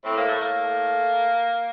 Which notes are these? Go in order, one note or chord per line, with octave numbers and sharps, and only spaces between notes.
A2 C4
A#3
A3
A2 A#3
A3